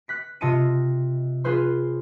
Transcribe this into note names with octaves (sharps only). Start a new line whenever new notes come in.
F#6 B6 C#7
C3 F4 D#5 A5 C#7 D#7
F4 G#4 B4 C5 C6